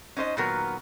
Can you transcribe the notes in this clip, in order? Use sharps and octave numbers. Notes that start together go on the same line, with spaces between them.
C#4 D#4 C5 D#5
A#2 D#3 F#3 B3 A#4